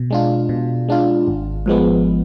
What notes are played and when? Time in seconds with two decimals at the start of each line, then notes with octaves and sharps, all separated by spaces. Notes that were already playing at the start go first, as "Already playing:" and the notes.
Already playing: B2
0.10 G#3 D4 F4
0.49 B2
0.89 G#3 D4 F4
1.27 G#1
1.66 G#2 F3 G#3 B3